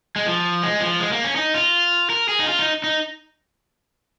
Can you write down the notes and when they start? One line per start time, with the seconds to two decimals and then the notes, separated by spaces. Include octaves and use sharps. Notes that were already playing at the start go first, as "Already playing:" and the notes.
0.16 G#3
0.27 F3
0.63 G#3
0.81 F3
1.00 G#3
1.12 A#3
1.24 C#4
1.36 D#4
1.54 F4
2.10 A#4
2.29 G#4
2.40 D#4
2.47 F4
2.59 D#4
2.84 D#4